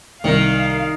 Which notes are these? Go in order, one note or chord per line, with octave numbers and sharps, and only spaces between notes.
C2 D#3 A#4 F5 C#7